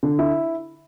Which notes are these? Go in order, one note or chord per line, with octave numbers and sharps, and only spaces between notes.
D3
E4